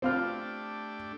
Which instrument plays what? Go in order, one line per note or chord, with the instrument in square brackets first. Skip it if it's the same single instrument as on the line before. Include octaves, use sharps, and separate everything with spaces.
[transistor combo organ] A3 D4 G4 [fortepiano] C4 F4 F6